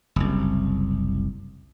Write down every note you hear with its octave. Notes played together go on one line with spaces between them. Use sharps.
F#1 C2